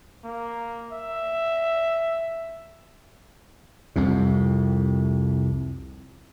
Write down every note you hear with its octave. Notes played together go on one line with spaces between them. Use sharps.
A#3
E5
C2 F2 C3